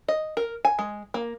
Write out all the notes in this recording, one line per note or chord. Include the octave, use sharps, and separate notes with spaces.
D#5
A#4
G#5
G#3
A#3